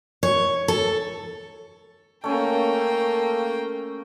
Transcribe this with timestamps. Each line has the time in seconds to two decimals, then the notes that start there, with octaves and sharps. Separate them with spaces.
0.23 C#5
0.68 A4
2.24 A3 A#3 C#4 G5